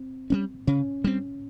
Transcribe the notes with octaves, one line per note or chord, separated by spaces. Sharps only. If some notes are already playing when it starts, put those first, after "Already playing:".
Already playing: C4
G3 A#3 C#4
C#3 C#4
G3 C4